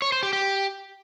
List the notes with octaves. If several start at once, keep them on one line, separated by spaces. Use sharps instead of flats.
C#5
C5
G4
G4